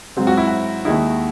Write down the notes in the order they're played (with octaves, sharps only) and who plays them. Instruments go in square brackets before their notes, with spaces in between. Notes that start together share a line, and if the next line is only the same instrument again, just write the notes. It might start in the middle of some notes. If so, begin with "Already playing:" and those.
[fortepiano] G#2 F#3 C4
[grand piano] F#4
E4
F#4
[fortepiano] D#2 D#3 G#3 D#4 [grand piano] E4